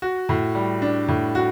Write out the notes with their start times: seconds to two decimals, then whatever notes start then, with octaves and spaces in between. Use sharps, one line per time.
0.02 F#4
0.29 A2
0.55 G3
0.82 D4
1.08 A2
1.35 F#4